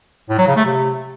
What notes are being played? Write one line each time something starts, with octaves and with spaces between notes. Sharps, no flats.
A2
F#3
C#3
A3
C3